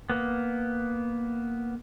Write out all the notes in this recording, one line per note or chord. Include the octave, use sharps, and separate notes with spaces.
A#3 B3